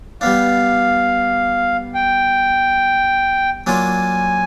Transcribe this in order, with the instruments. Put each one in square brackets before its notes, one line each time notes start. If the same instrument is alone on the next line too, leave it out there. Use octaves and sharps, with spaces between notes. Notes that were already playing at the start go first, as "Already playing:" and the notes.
[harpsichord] G3 B3 D4 [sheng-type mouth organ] F5
[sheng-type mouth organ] G5
[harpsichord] F#3 A#3 D4 F4 [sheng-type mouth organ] G#5